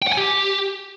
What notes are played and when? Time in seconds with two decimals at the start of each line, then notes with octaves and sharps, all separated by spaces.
0.02 G5
0.07 F#5
0.12 G#5
0.17 G4